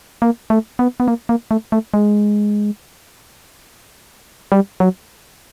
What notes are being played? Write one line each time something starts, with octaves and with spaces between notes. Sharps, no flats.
A#3
A3
B3
B3
A#3
A#3
A3
A3
G#3
G3
F#3